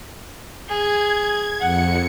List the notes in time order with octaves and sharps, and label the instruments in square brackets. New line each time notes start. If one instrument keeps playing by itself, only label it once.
[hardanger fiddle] G#4 [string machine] G#6
[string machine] F2 C#7 [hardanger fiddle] F#5